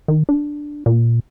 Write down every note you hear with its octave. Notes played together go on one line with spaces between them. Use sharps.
D#3
D4
A#2